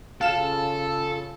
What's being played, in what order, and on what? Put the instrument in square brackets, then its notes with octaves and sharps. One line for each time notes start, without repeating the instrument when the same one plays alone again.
[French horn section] C#3 F4 [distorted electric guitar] A4 [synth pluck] F5 E7